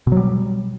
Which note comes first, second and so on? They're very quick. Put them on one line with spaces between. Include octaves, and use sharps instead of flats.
B2 F#3 G3